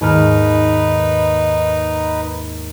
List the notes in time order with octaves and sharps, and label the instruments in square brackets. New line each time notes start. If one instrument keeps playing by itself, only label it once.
[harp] D#2 G#2 F6 [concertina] D#4 B4